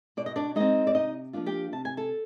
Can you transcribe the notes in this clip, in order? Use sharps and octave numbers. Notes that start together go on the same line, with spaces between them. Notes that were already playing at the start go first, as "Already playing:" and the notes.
B2 D5
D#5
D4 D5
G#3 C4 D#4 D#5
D5
C3 D#4 D#5
F3 A#3 D4 F4
G4 G5
C3 A5
G#5
A4 A5